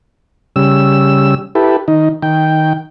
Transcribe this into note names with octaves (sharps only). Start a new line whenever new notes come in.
C#3 G3 E6
E4 G4 A4 B4
D#3 D#4
D#3 G5